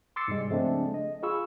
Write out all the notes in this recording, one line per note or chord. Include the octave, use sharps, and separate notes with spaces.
C6 D6 E6 A6 C7 C#7
G#2 C3 G3 G#3
C#3 F3 G#3 A3 C4 D4
D#5
F4 G#4 F5 B5 C#6 E6